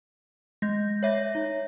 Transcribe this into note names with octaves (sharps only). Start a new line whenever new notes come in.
G#3 G6 A#6
C#5 E5 A#6
D#4